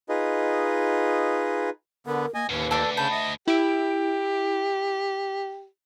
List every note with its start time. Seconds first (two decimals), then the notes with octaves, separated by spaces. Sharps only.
0.09 D#4 F4 G#4 B4 D#5
2.07 D3 B3 A#4
2.35 A#3 D#5 G#5
2.49 D#2 A2 C#4 B4
2.71 D2 A4 D5 D6
2.97 C#3 A5 B5 G6
3.11 D#5 E5
3.48 E4 G4 D7